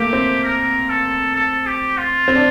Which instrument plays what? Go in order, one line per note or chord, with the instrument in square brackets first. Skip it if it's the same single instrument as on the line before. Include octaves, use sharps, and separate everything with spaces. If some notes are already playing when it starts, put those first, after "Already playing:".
Already playing: [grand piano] A3 A#3 [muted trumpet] G4
[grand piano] C4
[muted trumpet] A#4
A4
A4
G4
F4
[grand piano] C4
D4